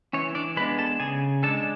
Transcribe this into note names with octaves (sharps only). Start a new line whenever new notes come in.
E3 C#4 C#5
D4 D5
G#3 B3 D4 B4 B5
A4 A5
C#3 G#4 G#5
G#3 D4 A4 A5